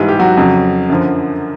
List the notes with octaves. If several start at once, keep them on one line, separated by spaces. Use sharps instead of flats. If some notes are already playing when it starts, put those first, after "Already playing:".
Already playing: G#2 E3 G3 E4
G4
F#3 F#4
F2 C#3 F#3
F#2 D3 F3